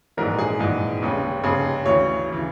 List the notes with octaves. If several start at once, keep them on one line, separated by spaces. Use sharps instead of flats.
A#1 G#2 E3 A#4
G#4
A#1 G#2 E3
F1 D#2 C#3
F1 D#2 C#3 G#4
D2 C#3 E3 C#5
C#3 E3